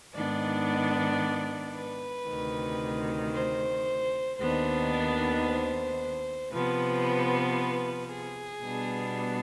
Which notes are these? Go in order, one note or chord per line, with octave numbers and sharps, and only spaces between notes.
G#2 D#3 B3 D4 D5
B4
D2 C3 D#3
C5
D#2 D#3 B3 D4 C5
D5
C5
C3 F3 B3 B4
B4
G#4
B2 G3 B3 D4